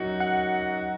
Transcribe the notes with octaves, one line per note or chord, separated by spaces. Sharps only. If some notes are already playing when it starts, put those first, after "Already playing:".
Already playing: F#2 F#3 D#4 F#4
F#5